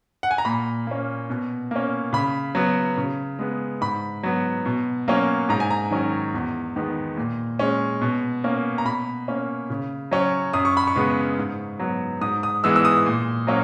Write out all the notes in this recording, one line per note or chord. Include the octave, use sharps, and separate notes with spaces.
F#5
G#5
A#5
A#2 B5
A#3 C#4
B2
A#3 C#4
C#3 B5
F#3 B3
C#3
G#3 B3
G#2 B5
F#3 B3
B2
F#3 A#3 C#4
G#2 A#5
G#5
A#5
D#3 F#3 C#4
E2
D#3 G#3 B3
A#2
G#3 C#4
B2
A#3 C#4
A#5
B2 B5
A#3 C#4
C#3
F#3 C#4
F#2 D#6
C#6
B5
C#6
C#3 G#3 B3
G#2
F#3 B3
G#2 D#6
D#6
E3 G#3 B3 E6
E6
D#6
A#2
F#3 A#3 C#4